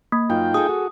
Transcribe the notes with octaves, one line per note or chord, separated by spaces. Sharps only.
A#3
F#2 D#4 F4 G5
G#4 A4 D#6
F#4